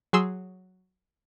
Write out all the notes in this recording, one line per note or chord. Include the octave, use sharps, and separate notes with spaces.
F#3 G#4 C6 E6